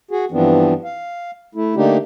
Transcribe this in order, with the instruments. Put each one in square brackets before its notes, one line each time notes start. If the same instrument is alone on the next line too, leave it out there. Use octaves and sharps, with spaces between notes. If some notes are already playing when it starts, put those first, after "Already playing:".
[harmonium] F#4 G#4
G2 E3 F3 B3 C4 D4
F5
A3 E4
D3 A3 A#3 D4 D#4 G4